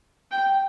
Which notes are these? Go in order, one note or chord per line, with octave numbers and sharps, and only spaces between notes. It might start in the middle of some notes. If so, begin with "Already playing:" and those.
G5